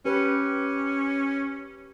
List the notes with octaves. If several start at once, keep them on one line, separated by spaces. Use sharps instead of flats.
C#4 G4 B4